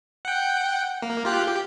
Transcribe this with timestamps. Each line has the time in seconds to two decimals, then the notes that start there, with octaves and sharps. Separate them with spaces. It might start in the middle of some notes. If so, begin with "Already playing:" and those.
0.25 F#5 G5
1.02 A#3
1.25 F4 G4 F#6
1.48 G4